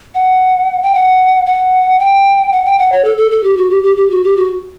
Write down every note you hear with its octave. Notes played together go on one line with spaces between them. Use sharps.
F#5
G5
F#5
F#5
G5
F#5
G5
F#5
C#5
A4
A4
A4
G4
F#4
G4
G4
G4
F#4
G4
F#4